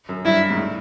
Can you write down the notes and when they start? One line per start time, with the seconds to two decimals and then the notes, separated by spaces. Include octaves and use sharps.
0.09 F#2
0.25 G2 E4
0.50 G#2
0.57 A2